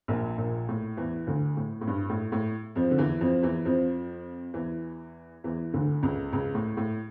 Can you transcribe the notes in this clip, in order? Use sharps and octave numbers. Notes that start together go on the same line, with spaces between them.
A#1 A#2
A#1 A#2
A2
E2 E3
D2 D3
A2
A2
G2
A2
A2
F2 F3
D3
E2 E3
F2 F3
E2 E3
F2 F3
E2 E3
E2 E3
D2 D3
C#2 C#3
C#2 C#3
A2
A2